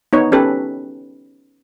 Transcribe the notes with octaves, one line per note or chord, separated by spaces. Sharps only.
B3 D#4 C#5
C#4 G4 A4 B4